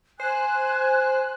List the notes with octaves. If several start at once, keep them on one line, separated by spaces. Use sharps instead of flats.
C5 G#5 F#6